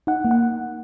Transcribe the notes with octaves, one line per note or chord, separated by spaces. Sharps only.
D#4 F#5
A#3
F#5